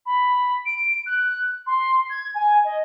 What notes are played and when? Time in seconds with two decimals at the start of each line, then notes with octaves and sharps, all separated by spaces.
0.06 B5
0.65 D7
1.06 F#6
1.66 C6
2.10 G#6
2.34 G#5
2.64 D#5